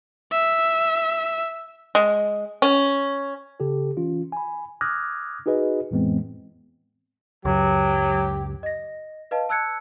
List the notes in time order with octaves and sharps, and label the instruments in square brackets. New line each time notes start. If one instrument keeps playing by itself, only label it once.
[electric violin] E5
[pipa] G#3
C#4
[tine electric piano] C#3 G4 A4
E3 C#4 F4
G#5 B5
D6 D#6 F6 F#6 G#6 A#6
D#4 F#4 G#4 B4 D#5
F2 A2 E3 G#3 B3 C4
[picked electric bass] C#2 F#2 [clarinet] F#3 [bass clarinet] G4
[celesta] D#5 A#6
B4 D#5 F5 A5
A5 E6 F#6 G#6 C#7